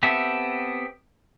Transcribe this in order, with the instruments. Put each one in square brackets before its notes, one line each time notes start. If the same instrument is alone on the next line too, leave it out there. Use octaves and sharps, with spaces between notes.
[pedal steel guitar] B3 C4 G4 A4 E5